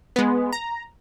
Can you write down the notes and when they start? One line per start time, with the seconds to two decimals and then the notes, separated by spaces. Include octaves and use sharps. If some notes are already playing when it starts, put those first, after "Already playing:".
0.16 G#3 B3
0.52 A#5